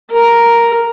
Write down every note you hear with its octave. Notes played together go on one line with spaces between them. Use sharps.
A#4 A#5